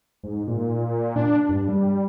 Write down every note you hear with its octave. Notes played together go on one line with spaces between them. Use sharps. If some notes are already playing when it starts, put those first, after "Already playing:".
G#2
A#2
D4
G2
G3